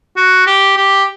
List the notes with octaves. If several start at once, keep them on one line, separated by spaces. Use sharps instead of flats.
F#4
G4
G4